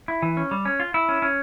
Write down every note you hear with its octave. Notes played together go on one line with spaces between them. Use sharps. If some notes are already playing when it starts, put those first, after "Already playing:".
E4
E3
C#4
G3
C#4
F4
E4
C#4
C#4